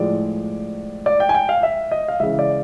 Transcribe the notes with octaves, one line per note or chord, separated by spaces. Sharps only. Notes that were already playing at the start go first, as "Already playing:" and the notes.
Already playing: A2 F3 G#3 D5
D5
G5
G#5
G5
F5
E5
D#5
F5
C#3 E3 G#3 E5
D5